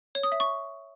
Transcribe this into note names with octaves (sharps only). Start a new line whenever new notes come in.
C#5
D#6
E5
C#6